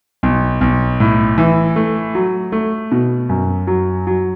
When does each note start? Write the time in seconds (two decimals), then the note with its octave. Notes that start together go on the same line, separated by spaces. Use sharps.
0.23 B1
0.61 B1
1.00 A2
1.38 E3
1.76 A3
2.15 F#3
2.52 A3
2.92 B2
3.29 F#2
3.67 F#3
4.07 F#3